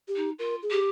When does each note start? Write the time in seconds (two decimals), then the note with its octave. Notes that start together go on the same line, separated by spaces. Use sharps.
0.08 G4
0.16 D#4
0.39 F4 A#4
0.63 G#4
0.71 G4